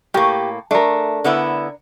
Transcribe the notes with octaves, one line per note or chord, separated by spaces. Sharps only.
A2 A#3 G4
A3 D4 A#4
D3 B3 E4